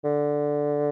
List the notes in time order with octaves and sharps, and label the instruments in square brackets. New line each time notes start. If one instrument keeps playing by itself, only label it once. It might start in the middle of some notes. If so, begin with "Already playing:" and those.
[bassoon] D3